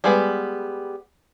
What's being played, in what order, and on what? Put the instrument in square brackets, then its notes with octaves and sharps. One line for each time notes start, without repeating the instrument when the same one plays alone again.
[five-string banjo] G3 G#3 B3